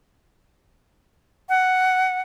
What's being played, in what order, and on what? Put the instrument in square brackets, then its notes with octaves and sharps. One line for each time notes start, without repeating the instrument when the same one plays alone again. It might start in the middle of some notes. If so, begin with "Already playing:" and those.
[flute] F#5